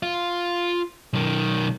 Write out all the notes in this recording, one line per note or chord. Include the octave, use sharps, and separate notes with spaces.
F4
B1 D#3